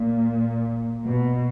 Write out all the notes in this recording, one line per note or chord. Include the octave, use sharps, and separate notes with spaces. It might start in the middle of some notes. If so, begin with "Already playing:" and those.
Already playing: A#2
B2